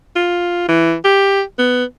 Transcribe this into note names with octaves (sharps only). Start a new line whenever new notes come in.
F4
E3
G4
B3